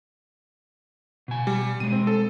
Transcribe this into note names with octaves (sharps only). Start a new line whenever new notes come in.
B2 G#5
G3
B2 G#3 D#7
C4
A4